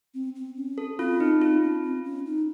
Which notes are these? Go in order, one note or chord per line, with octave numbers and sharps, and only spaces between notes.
C4
C4
C#4
A4
C4 F4
D#4
C4 F4
C#4
C4
C#4
D#4